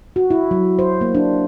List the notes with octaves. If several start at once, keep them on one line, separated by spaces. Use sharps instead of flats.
F#4
E4
F#3
C5
A#3
D4